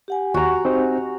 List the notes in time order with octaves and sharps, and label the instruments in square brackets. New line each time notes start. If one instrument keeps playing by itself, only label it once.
[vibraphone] G4 F#5 G#5
[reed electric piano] D#2 [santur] F#4 A#5
[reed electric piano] C4 D#4 C5